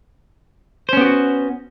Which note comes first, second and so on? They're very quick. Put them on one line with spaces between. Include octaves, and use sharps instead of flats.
C5 C#4 B3 G4 F#4